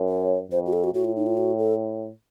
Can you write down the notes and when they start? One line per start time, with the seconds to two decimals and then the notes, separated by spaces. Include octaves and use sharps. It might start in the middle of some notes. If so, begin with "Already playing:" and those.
Already playing: F#2
0.09 C#5
0.51 F2 C5
0.66 F#4
0.73 A4
0.84 F#4
0.94 A2 F#4
1.05 F4
1.16 D#4
1.26 F4
1.37 F#4
1.59 A4